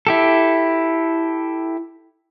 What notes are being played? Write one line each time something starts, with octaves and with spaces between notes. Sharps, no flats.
E4 G4 A4